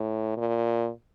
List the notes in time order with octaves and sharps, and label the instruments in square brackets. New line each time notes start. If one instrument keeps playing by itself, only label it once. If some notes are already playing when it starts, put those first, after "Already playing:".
Already playing: [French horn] A2
A#2